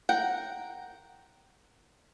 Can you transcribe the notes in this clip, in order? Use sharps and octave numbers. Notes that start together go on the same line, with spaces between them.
A#4 F#5 G5